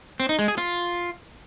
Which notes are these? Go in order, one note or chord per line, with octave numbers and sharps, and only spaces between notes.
C4
D#4
G#3
G#4
F4